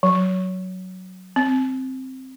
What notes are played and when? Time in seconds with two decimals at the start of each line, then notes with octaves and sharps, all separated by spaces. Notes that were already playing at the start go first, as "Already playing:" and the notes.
0.03 F#3
1.36 C4